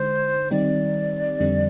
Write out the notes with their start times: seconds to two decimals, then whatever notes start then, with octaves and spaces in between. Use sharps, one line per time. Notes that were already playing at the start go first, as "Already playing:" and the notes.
Already playing: D3 G#3 D#4 C5
0.51 D#3 G3 C4 D#4 G4 D5
1.40 F2 D3 G3 C4